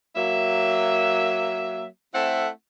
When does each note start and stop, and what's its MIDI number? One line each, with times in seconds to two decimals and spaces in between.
0.16 1.86 54
0.16 1.86 58
0.16 1.86 76
2.14 2.48 57
2.14 2.48 60
2.14 2.48 64
2.14 2.48 69
2.14 2.48 76
2.14 2.48 78